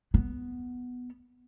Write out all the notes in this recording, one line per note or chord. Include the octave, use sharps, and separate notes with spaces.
B3